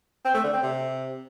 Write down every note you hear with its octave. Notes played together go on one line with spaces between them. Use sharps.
C4
A3
D3
C4
C3